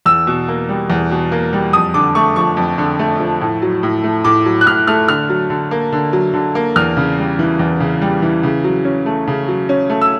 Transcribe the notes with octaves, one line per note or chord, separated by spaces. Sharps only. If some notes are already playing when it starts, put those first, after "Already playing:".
E2 E6
B2
A#3
G3
E2
B2
A#3
G3
F2 D#6
D3 D6
A3 C#6
F3 C#6
F2
D3
A3
F3
A2
F#3
A2
A3
A2 D6
F#3
F#6
A2 F6
A3 F6
D3 F6
F#3
D3
A#3
D3
F#3
D3
A#3
E2 F6
C#3
G3
E3
E2
C#3
G3
E3
C#3
F#3
C#4
A3
C#3
F#3
C#4
A3
E6